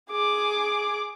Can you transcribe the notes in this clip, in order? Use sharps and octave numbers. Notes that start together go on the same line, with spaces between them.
G#4 D6